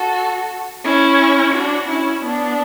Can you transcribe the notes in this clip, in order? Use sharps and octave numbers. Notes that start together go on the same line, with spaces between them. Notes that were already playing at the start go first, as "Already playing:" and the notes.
Already playing: F#4 A4
C#4 E4
D4 F#4
C#4 E4
B3 D4